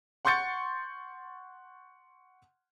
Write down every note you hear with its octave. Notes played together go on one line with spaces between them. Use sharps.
F#5 C6 C#6 G6 A6 C#7